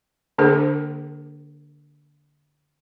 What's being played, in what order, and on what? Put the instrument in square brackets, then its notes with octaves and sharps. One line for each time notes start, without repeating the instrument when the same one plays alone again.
[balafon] D3 A#3 D4 G#4 A#4 C5